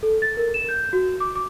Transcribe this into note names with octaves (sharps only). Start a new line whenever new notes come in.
A4
A6
A#4
E7
G6
F#4
D6
D6